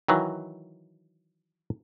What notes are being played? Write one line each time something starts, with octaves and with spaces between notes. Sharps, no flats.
D#3 E3 F#3